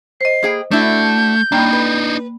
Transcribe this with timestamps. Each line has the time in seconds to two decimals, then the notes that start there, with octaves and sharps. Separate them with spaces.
0.21 C5 D#5 C7
0.43 A#3 G#4 G5
0.71 A3 D4 E4 F#4 G6
1.52 G2 A#3 D4 D#4 G5
1.73 B4